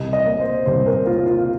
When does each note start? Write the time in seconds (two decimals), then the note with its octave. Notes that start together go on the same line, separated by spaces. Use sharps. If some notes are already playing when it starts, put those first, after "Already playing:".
Already playing: C2 D#5
0.13 D#5
0.26 A#3
0.40 C5
0.66 C2 C5
0.86 A#4
1.06 A#3 F4
1.26 F4